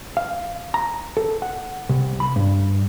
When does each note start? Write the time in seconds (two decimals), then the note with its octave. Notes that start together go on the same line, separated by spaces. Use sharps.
0.17 F5
0.74 A#5
1.17 A4
1.42 F#5
1.90 C2
2.20 B5
2.36 G2